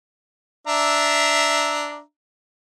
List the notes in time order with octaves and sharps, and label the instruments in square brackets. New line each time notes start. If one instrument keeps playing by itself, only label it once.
[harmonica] D4 E5 A#5